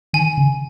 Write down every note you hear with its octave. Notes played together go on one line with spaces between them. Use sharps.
D#3 G#5
C#3